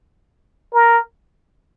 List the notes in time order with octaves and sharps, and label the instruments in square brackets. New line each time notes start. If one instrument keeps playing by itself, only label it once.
[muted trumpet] A#4